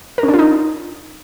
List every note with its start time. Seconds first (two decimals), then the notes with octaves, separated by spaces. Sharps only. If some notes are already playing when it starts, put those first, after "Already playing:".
0.18 A#4
0.23 C#4
0.28 D4
0.34 F4
0.39 D#4